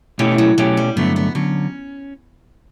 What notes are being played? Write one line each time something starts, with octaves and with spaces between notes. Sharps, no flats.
B2 E3 A3 C#4 G4
F#3
B2 F#3 A3 C#4 G4
G3
G2 D3 F#3 A3 B3
B3
D3 F#3 C#4